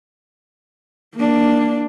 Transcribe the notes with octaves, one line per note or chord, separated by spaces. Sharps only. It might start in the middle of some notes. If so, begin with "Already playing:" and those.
A#3 D4